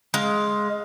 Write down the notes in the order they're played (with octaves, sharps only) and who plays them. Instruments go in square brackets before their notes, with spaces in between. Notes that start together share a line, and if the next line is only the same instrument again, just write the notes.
[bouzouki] G#3 F5